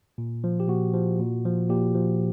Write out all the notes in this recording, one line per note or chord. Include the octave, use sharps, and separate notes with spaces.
A#2
F3
G4
A#2 F#4
F3
A#2
F3
A#2 G4
F3